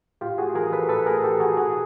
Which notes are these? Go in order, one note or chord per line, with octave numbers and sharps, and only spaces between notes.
A2 F4 G4
F#4 G#4
E3 G#4 A#4
A4 B4
A2 A4 B4
G#4 A#4
E3 G4 A4
F#4 G#4
B2 F#4 G#4